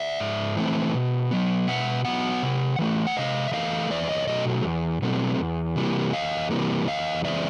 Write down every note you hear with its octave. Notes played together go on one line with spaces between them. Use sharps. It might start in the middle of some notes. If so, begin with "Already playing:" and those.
Already playing: D5 E5
G#2
E3 A3 C4
B2
F#3 B3
B2 E5 F#5
F#3 B3 E5 F#5
C3
E3 A3
F#5
C3 D#5 F5
E5
E3 A3 D#5 F5
E2 D5 E5
C#5 D#5
B2 F#3 A3 D#5
E2
B2 F#3 A3 C4
E2
C3 E3 G3 A#3
E2 D#5 F5
C3 E3 G3 A#3
E2 D#5 F5
C#3 E3 G#3 C4 D5 E5